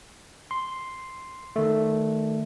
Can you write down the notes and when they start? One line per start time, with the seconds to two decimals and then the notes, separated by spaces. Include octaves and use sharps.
0.51 C6
1.56 D#3 A3